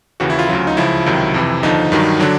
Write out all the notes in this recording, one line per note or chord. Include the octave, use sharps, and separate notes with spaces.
D#2 C#3 E3 F#4
E4
F4
D2 C#3 F#3 F4
D#4
C#2 C#3 F3 E4
C#2 C3 D#3 F#3
F2 C3 E3
D#2 D3 F3 D#4
G2 D#3 F#3
D3 F#3 D4